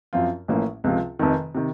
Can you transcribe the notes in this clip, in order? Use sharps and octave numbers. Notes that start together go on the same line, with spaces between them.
F#2 F3 C4 F4
A1 A2 F3 A#3 C#4
C#2 C3 F3 C4 F4
F1 F2 C3 D#3
C3 D#3